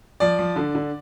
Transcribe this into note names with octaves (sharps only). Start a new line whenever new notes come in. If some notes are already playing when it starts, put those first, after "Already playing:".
F3 D5
F3
D3
D3